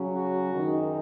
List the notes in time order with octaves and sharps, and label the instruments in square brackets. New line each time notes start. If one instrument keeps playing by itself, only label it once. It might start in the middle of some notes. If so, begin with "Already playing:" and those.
Already playing: [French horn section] C#3 F#3 C#4
F#4
F#2 D#3 G#3 D#4